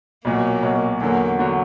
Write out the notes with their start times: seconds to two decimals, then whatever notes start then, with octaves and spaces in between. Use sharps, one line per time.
0.25 B1 A#2 F#3 A#3
0.63 B1 A#2 F#3
1.01 E2 D3 F#3 A#3
1.39 D3 F#3